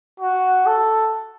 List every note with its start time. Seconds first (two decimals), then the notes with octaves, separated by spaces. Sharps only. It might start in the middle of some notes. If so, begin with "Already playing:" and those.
0.20 F#4
0.66 A4